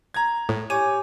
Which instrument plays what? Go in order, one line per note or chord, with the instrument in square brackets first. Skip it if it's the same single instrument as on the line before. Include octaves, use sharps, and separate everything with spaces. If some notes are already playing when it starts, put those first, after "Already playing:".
[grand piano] A#5 G#6
[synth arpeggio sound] A2
[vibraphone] G4 G#5 D6 [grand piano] C#5 [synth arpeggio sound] D#7